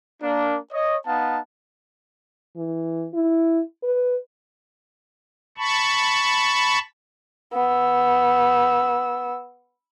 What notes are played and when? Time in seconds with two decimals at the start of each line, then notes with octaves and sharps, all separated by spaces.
0.22 A#3 D4
0.73 C#5 D#5
1.07 B3 D#4 F5 A5
2.57 E3
3.14 E4
3.83 B4
5.58 A5 B5 C#6
7.53 B3 E6